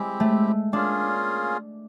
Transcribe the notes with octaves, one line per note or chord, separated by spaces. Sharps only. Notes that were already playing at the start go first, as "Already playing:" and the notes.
Already playing: G#3 C4 E4 G4
A3
A#3 C#4 D4 F4 G#4